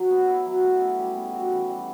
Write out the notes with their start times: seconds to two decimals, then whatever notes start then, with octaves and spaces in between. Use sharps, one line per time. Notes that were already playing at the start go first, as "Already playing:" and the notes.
Already playing: F#3
0.10 B3
0.28 E4
0.46 F#3
0.64 A3
0.81 C#4
0.98 G3
1.17 B3
1.34 F#4
1.52 E3
1.69 G3